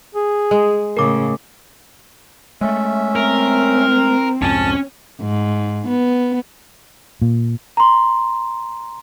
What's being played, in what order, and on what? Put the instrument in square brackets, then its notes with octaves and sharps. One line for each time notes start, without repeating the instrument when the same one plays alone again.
[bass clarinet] G#4
[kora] G#3
[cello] A2 C#3 [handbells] A#4 D6
[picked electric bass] G#3 A3 [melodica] C#4 E5
[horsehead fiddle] C4 [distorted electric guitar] A#4
[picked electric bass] C2 F2 G#2 [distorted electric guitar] C#4 G#5 [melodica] A5
[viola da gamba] G#2
B3
[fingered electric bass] A#2
[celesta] A#5 C6